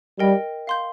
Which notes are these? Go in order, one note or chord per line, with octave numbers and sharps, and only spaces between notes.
G3 A#4 D#5 G5
F5 C6 G6